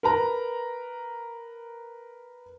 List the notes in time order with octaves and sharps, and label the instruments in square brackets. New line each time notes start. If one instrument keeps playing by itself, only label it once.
[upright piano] A#4 B4 A#5